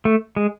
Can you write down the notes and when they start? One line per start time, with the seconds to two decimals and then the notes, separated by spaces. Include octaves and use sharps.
0.05 A3
0.36 G#3